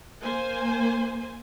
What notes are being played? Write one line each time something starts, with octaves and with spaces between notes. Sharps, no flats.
A#3 C5 G#5